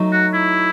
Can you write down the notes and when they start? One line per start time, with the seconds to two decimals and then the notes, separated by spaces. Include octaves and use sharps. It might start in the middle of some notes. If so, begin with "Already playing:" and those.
Already playing: F#3 A3 D#4
0.12 F#4
0.34 E4